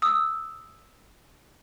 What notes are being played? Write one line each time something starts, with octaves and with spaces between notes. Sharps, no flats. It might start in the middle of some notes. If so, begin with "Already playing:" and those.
D#6 E6